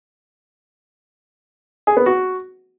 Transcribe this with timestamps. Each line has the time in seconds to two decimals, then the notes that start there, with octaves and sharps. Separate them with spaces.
1.87 G#4
1.97 B3
2.06 F#4